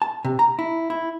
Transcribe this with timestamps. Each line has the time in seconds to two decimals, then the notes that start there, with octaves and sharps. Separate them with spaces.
0.02 A5
0.25 C3
0.39 A#5
0.59 E4
0.90 E4